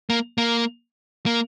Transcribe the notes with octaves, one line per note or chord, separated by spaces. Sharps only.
A#3
A#3
A#3